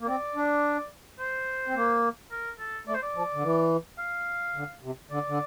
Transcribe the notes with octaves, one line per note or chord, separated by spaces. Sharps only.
A#3
C4 D5
D4
C5
C4
A#3
A#4
A4
A3 D5
C5
D5
F3
D3
E3
F5
D3
C3
D3 D5
D3